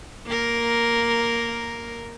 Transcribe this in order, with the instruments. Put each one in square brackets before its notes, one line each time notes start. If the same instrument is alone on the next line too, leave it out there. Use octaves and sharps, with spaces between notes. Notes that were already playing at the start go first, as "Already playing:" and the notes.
[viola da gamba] A#3 A#4